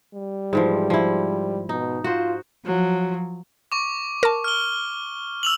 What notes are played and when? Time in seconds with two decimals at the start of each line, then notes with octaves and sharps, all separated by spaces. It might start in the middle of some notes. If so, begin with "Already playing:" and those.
0.14 G3
0.53 G#2 E3 F3
0.90 F3 E4
1.69 B2 D#4
2.04 F4 F#4 C5
2.65 F3 F#3
3.72 C#6 D6
4.23 A#4 A5
4.44 F6 G7
5.43 E6 F7 F#7